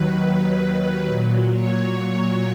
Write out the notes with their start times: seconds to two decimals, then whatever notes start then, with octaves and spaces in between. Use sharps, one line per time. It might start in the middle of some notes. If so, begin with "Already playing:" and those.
Already playing: D#2 D#3 F#3 B4
1.06 A#2 F#3
1.51 C#5